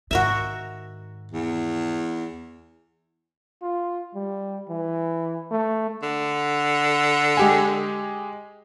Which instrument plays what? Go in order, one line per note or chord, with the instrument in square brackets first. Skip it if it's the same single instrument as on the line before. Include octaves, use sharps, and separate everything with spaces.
[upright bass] G#2 D#3 [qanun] F#4 A#4 E5
[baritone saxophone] E2
[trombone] F4
G3
E3
A3
[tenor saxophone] D3
[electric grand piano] G#3 G4 G#5